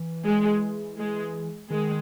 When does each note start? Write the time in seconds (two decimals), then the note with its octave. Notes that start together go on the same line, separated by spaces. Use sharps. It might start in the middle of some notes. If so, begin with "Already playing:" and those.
Already playing: E3
0.25 G#3
0.98 G#3
1.70 D#3 G#3